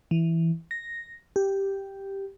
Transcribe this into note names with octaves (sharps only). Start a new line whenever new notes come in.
E3
A#6
G4